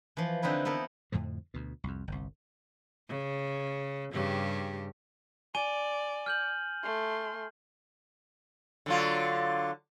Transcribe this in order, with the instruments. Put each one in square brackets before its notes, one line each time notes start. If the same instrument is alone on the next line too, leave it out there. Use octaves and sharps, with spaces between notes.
[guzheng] E3 F3
D3 C4 D#4 E4 B4
B3 E4 A4 A#4
[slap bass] F2 A2 D3 F3
D2 B2
C2 F2
G1 C2
[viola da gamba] C#3
G2 C#3 G4
[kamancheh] D5 [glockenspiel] G#5 D#7 G7
[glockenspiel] F6 G6 F#7
[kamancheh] A3 C6
[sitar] D3 F#3 F4